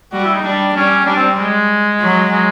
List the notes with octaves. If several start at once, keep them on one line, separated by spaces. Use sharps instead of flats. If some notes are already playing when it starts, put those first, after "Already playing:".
G3 F#4
E4
D#4
G3 D4
G3 C#4
G3 D4
C4
G#3
F#3
G#3